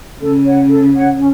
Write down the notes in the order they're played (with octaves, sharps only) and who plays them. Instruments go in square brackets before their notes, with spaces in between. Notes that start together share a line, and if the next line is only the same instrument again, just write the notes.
[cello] C#3 [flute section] A4
[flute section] C#5 F#5
A4
C#5 F#5
C#4